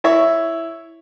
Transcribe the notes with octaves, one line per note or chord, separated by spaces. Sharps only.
E4 C#5 E5